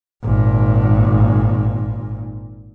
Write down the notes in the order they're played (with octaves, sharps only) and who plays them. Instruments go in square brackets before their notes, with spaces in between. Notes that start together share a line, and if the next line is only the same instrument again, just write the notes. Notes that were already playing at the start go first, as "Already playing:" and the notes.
[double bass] G#1 A#2